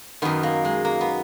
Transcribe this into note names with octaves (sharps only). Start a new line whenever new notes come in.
F#2 D#3 B3
A#3
G#3
A#3
B3